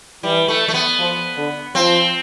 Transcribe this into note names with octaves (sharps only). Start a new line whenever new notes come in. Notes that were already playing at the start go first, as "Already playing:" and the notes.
E3 G3
A3
A3
B3
F3
D3
F3 C4